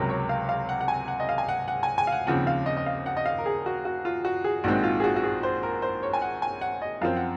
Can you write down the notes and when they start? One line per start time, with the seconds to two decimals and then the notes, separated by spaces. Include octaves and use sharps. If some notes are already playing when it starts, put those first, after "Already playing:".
Already playing: C#2 C3 F#3 A#4
0.09 C#5
0.29 F5
0.49 F5
0.69 F#5
0.81 F#5
0.88 G#5
1.08 F#5
1.20 D#5
1.29 F5
1.38 G#5
1.49 F#5
1.68 F#5
1.83 G#5
1.98 G#5
2.07 F5
2.12 F#5
2.27 D#2 C#3 F3 C4 F#5
2.47 F5
2.66 D#5
2.77 D#5
2.86 F5
3.06 F#5
3.17 D#5
3.26 F5
3.38 A#4
3.46 G#4
3.66 F#4
3.85 F#4
4.05 F4
4.25 F#4
4.44 G#4
4.64 A#1 G#2 D#3 G#3 C4 F#4
4.83 F4
5.00 G#4
5.04 F#4
5.16 F#4
5.24 G#4
5.43 C5
5.63 A#4
5.82 C5
6.03 C#5
6.13 G#5
6.22 F#5
6.42 G#5
6.61 F#5
6.82 D#5
7.01 F#2 F3 C4 F5
7.17 F#5